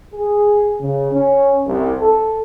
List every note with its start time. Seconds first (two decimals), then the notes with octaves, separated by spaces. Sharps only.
0.13 G#4
0.81 C#3
1.12 C#4
1.66 C2
2.01 A4